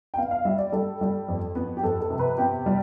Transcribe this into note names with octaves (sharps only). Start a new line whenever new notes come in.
G5
B3 F5
F5
G3 E5
D5
G3 A4
G3
F2
B3
G4
F2 A4
A4
C3
B4
B3 G4
G3